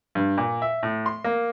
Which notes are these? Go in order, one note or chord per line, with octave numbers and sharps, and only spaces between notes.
G2
A#2
E5
A2
C6
A#3